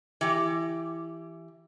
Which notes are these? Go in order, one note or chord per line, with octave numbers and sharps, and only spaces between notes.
E3 G4